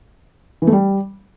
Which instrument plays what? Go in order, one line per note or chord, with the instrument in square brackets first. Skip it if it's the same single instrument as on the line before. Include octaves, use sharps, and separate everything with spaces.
[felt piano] E3
A3
G3